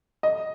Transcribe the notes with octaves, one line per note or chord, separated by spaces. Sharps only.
D#5